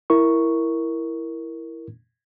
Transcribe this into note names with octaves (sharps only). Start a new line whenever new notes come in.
E4 A#4 C#6